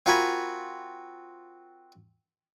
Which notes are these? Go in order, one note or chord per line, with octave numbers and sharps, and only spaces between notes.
C4 F4 F#4 A#4 G#5 B5